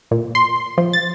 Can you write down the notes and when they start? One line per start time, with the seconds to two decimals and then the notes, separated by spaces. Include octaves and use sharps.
0.11 A#2
0.35 C6
0.78 F3
0.93 A6